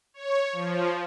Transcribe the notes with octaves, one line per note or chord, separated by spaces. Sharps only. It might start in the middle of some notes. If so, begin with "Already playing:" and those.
C#5
F3